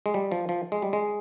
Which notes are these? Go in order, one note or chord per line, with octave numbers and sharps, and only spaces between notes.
G#3
G3
F3
F3
G#3
G3
G#3